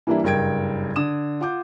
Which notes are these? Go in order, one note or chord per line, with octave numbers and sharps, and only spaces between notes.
E3 G3 A#3 D4 E4
F#1 G2 A#4 G5 G#6 D7
D3 D#6 E7
F4 F#5 D6 G6